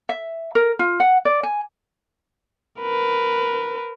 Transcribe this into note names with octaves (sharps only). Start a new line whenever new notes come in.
E5
A#4
F4
F#5
D5
G#5
A#4 B4